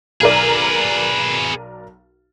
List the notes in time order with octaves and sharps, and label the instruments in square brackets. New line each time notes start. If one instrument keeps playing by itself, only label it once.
[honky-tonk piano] B1 A#4 D5 [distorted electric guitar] G#4 B4